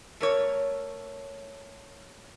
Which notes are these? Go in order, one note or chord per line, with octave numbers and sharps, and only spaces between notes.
A3 A#4 C#5